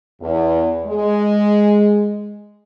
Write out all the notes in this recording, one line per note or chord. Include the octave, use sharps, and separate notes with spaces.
E2
G#3